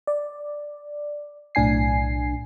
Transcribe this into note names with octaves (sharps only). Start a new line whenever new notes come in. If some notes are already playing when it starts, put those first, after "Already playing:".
D5
B1 A2 D4 G#5 C7